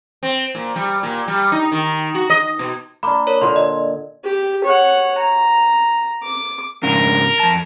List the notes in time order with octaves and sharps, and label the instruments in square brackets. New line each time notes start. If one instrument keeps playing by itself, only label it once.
[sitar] C4
A#2
G3
A#2
G3
D#4
D#3
F#4
D#5
B2
[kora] A#3 D4 [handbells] B5 D6
[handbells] A#4 C#5
[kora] A#2 D3 [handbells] C6
[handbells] D#5
[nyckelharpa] G4
C#5 F#5
A#5
D6
[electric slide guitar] G#2 C#3 D4 [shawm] A#4
[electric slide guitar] F2 A5